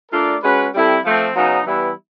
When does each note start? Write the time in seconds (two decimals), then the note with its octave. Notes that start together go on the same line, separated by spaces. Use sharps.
0.11 A3 D4 F4 A#4 D5
0.43 G#3 C#4 F#4 B4
0.73 G3 C4 E4 A4
1.04 F3 A3 C4
1.35 C#3 F#3 B3 D#4
1.66 E3 G3 B3 E4